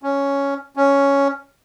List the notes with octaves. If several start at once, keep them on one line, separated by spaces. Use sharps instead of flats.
C#4
C#4